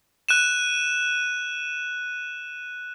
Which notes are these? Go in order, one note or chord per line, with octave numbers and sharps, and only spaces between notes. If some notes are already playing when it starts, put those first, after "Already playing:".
F#6 D#7 E7